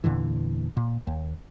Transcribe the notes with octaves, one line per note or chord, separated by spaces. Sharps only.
E2 A#2 D3 E3
A#2
D#2